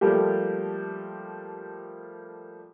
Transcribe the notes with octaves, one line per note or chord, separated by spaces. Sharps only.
F3 G3 A3 A#3 G4